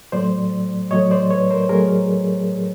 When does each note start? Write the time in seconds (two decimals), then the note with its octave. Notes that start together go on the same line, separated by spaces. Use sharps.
0.12 A2 F#3 A3 C5 D5
0.91 A2 F#3 A3 C#5 D#5
1.11 C5 D5
1.30 B4 C#5
1.50 A#4 C5
1.69 A2 F#3 A3 G#4 A#4